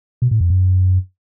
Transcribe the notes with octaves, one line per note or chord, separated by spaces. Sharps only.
B2
A2
F2
F#2